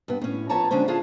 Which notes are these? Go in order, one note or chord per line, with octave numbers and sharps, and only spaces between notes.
G2 B3
A2 C#4
F3 B3 A4 C#5 A5 A#5
D3 G#3 C#4 D4 C5
D4 E4 F4 G#4 A4 A5